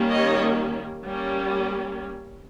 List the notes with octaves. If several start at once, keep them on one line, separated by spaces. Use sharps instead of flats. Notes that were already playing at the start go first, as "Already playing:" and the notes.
Already playing: D#3 G3 A#3 C#4
C#5 D#5
G3 A#3 C#4